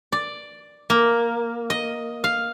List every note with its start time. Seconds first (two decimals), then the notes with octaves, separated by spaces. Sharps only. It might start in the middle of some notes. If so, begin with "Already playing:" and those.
0.12 D5
0.90 A#3
1.70 D#5
2.24 F5